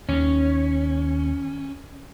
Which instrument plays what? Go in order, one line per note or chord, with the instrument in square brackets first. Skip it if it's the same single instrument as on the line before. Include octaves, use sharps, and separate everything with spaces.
[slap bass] D#2 D#3 [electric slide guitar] C#4